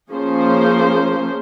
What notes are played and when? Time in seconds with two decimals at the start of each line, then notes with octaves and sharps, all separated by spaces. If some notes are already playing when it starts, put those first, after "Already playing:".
0.10 F3 A#3 C#4 G#4 C5